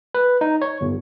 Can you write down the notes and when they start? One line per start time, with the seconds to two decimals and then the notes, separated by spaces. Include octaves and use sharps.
0.15 B4
0.41 D#4
0.62 C#5
0.81 G1